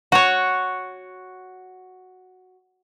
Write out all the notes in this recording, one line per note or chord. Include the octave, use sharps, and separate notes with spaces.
F#4 C#5